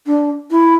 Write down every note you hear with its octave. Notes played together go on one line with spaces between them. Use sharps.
D4
E4